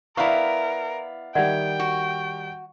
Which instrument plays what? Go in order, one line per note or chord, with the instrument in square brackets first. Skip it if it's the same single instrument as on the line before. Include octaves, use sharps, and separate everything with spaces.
[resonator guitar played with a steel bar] B3 E4 [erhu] A#4 [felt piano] D5 F5 A#5 [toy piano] C#6
[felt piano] D#3 G3 [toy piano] D5 E5 F#5 [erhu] G5
[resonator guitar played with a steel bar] F#4